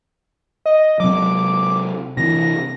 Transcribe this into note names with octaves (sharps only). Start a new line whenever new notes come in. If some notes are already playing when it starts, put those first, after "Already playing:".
D#5
C3 F#3 D6
C3 E3 A#6